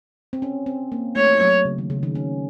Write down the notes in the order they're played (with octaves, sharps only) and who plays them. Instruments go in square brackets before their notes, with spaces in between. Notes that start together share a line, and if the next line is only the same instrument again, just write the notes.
[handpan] C4
C#4
C4
A#3
[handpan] A3 [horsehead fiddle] C#5
[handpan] F#3
C#3
D#3
C#3
D#3
C#4